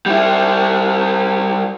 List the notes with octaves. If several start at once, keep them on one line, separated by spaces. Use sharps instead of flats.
G3 E4